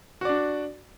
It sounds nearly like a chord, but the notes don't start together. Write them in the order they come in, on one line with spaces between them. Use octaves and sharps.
F#4 D5 D4